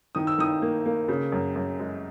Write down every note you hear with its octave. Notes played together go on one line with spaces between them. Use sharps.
D#3 D#6
E6
D#3 D#6
A#3
A#3
C#3
F#2
F#2
G#3